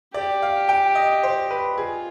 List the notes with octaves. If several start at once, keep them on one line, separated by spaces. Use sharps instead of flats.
G4 D5
F5
G5
D#5
C5
B4
F4 G#4